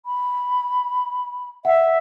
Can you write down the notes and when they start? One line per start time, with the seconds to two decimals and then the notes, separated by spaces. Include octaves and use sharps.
0.05 B5
1.65 E5 F#5